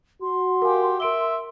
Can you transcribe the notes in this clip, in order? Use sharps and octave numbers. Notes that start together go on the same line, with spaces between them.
F#4 C6
G4 A#4 F5 G#5
A#4 E5 D7 G7